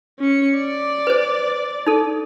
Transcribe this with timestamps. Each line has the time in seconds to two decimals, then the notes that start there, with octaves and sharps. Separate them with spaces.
0.19 C#4 C#7
0.58 D5
1.07 B4 C5
1.86 D#4 A4